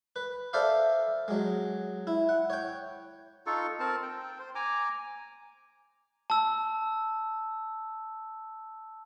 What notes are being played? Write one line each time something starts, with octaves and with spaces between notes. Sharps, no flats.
B4
A4 C5 D5 E5 F5
F#3 G#3
E4
F#5
C#5 G5
D#4 F4 A4 C#6
C4 A#4 A5
G5
C5
G#5 A#5 D6
A5 E6